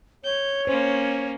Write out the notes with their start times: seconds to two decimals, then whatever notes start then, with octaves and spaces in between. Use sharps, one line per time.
0.24 C#5 G6
0.67 A#3 C#4 C5